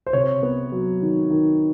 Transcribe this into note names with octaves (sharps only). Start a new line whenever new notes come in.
C5
C3 C#5
B3
F#3
D#3
D#3